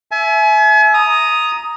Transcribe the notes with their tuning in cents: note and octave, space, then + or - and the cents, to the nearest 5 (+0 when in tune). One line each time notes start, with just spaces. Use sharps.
E5 +5 G#5 +40
A#5 +0 D#6 +0